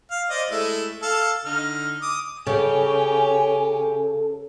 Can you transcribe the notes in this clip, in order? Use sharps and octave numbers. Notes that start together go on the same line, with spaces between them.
F5
C5 D5 D#5
G#3 A3 E4
A4 F5
D3 D#4 F6
D6 D#6
C#3 G4 A4 C#5 G#5